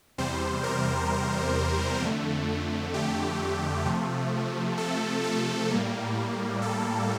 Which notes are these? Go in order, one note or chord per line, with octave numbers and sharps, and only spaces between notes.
E2 C3 G3 C5
A#4
F2 D3 A3
G4
C3 F3 A3
A4
A4
A2 G3 A#3
A4